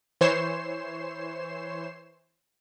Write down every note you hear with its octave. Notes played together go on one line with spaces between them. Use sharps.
E3 C5 C#5 C7 E7